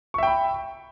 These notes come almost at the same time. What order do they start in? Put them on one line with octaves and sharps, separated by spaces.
C#6 E5 G5 B5